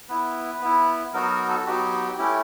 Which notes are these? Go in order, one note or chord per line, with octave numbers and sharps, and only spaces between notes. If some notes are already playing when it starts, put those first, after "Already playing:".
B3 E4 B4
B3 E4
F#3 B3 D#4 F#4 A#4
A#4
A4
F#3 B3 D#4 F#4 G4
A3 C#4 E4 G4